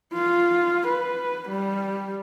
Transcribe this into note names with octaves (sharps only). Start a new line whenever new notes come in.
F4
B4
G3